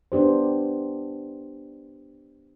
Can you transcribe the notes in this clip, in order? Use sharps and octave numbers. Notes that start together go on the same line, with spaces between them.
B3 D4 G4 C5